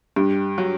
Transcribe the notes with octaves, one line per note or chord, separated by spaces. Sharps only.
G2 G3
F#3